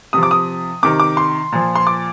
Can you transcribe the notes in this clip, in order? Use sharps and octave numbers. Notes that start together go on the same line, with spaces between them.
C3 F3 D#6
D6
D#6
C3 D#3 D6
D6
C6
A#2 F3
C6
D6